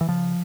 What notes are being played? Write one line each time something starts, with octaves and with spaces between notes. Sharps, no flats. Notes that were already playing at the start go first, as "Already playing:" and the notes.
E3
C#3 F3